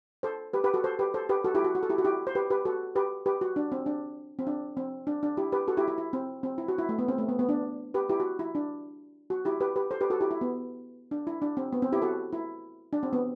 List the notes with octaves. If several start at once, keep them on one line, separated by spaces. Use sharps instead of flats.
A4 C5
G4 B4
G4 B4
F#4 A4
A4 C5
G4 B4
A4 C5
G4 B4
F#4 A4
E4 G4
F#4
F#4
A4
E4 G4
F#4
E4 G4
C5
G4 B4
G4 B4
F#4 A4
G4 B4
G4 B4
F#4
D4
C4
D4
C4
D4
C4
D4
D4
E4 G4
G4 B4
F#4 A4
E4 G4
E4
E4
C4
C4
E4
F#4
E4
A3
B3
C4
A3
B3
B3
D4
G4 B4
E4 G4
F#4
E4
D4
F#4
E4 G4
G4 B4
G4 B4
A4 C5
G4 B4
F#4 A4
E4 G4
E4
B3
D4
E4
D4
C4
B3
C4
E4 G4
F#4 A4
E4
D4
C4
B3